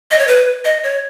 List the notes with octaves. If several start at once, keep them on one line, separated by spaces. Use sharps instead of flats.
D#5
C#5
B4
D#5
C#5